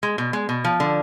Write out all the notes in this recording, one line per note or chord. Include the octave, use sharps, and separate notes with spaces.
G#3
B2
G#3
B2
F3
D3